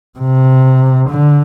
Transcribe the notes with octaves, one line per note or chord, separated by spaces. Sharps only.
C3
D3